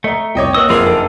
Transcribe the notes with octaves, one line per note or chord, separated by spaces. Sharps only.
A3 D#5 A#5 G7
C2 C#5 D#5 G5 D6
A#3 F#4 B4 C#5 D#5 D#6 E6
F#1 F2 C4 F4 G#4 A#4
D4 D#4 A4